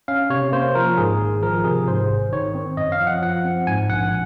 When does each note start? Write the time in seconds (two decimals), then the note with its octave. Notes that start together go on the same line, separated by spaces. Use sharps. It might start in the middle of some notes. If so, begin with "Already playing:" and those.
0.08 C#4 F5
0.30 C3 C#5
0.52 A#3 C5
0.75 F3 A#4
0.98 G#2 G#4
1.19 G#1
1.43 F3 A#4
1.65 C3 G#4
1.88 G#2 C5
2.10 G#1
2.33 D#3 C#5
2.55 C4
2.77 F#2 D#5
2.92 F5
3.00 F3
3.07 F#5
3.22 F3 F#5
3.44 C4
3.67 G#2 G#5
3.89 A#1 F#5